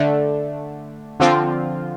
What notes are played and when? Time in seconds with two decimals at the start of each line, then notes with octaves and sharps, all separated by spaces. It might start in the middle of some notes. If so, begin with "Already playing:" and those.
Already playing: D3 A3 D4
1.20 D3 F3 C4 F4